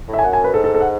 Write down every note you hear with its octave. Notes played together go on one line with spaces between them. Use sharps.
A2
E5
G#5
F#2 F#5
G#5
B4
G#2 A4
A4
A4
F#5